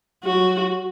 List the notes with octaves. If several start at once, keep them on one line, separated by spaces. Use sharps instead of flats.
F#3 F#4